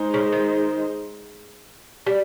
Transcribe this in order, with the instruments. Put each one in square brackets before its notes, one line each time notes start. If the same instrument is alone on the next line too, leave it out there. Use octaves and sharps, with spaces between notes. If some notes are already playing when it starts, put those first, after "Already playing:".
Already playing: [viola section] G#3 D#4 G#4 C5
[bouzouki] C#3
D#3
G3